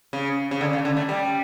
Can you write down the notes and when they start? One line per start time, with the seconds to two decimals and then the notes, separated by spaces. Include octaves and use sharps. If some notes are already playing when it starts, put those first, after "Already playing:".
0.13 C#3
0.51 C#3
0.61 D3
0.73 C#3
0.85 D3
0.97 A3
1.09 G3